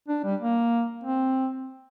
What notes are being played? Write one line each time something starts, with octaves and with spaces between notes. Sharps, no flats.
D4
G3
A#3
C4